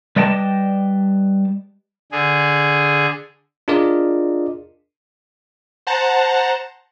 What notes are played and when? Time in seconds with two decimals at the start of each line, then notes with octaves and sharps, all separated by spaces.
0.16 G3 B4 D5 D#5 G5 A5
2.12 D3 G#4
3.68 D4 F4 G#4 A#4 D5 D#5
5.87 C5 F#5 A5 A#5